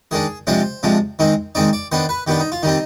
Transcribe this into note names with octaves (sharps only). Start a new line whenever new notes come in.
D#3 G#3 D4 G#4
C3 F3 G#3 D4 C5
C3 F3 G#3 D4
D#3 G#3 C4 D#4
D#3 G#3 C4 D#4 D5
D5
D#3 B3 D4 C5
B4
D#3 B3 D4 G4
D#4
F4
D#3 G3 C4 D#4